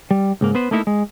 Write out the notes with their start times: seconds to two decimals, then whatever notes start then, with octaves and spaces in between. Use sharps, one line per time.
0.11 G3
0.41 C#2 G#2 A#3
0.55 B3 B4 C5
0.71 A3 A#3 D#4 E4 G#4 A#4
0.87 G#3